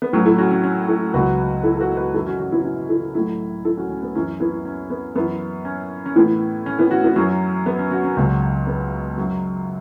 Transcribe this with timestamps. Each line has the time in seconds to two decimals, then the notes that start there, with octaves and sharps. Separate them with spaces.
0.02 B3
0.13 A2 F#3 C#4
0.26 E4 A4
0.38 C#4 F#4
0.51 C#4
0.64 C#4
0.88 E4 A4
1.14 C#2 B2 F#3 F#4 B4
1.63 E4 A4
1.76 A4
1.81 F#4 B4
1.97 F#4 B4
2.14 F#2 E3 E4 A4
2.26 C#4 F#4
2.39 C#4 F#4
2.52 B3 E4
2.64 C#4 F#4
2.89 E4 A4
3.15 A2 F#3 E4 A4
3.65 E4 A4
3.77 C#4 F#4
3.89 C#4
4.03 B3
4.15 F#2 E3 C#4
4.40 B3 E4
4.65 C#4
4.90 B3
5.16 F#2 E3 B3
5.65 C#4
6.06 C#4
6.16 A2 E3 B3 E4
6.66 C#4
6.79 B3 E4
6.91 C#4 F#4
7.04 B3 E4
7.16 F#2 F#3 C#4
7.66 B3
7.79 C#4
7.91 C#4 F#4
8.04 C#4
8.17 C#2 B2 F#3
8.67 B3
9.17 F#2 F#3